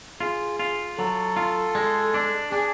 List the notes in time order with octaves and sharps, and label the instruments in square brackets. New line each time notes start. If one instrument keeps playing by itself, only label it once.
[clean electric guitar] F4 [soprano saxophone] G#4
[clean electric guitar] F4
[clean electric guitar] F#3 [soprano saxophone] A4
[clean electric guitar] F4
G#3
D4
[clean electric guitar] D4 [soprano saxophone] G#4